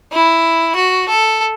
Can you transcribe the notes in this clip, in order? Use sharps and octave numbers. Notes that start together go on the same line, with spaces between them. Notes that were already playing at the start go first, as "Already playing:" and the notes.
E4
F#4
A4